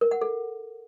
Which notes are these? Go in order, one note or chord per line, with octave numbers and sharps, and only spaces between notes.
A#4
F#5
A4